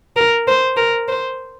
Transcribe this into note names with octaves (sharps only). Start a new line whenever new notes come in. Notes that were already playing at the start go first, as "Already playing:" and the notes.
A#4
C5
A#4
C5